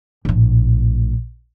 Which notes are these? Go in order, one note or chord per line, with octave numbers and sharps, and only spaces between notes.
A#1 A2